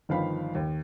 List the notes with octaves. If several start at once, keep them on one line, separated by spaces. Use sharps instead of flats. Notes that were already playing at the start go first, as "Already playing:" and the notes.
G1 D#3 F3 F5 B5
D#2